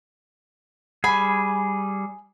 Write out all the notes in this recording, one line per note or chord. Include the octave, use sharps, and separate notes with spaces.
G3 G#4 G#5 B5